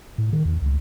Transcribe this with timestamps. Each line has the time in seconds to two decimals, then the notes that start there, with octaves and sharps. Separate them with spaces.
0.18 A2
0.33 D#3
0.45 E2
0.62 C#2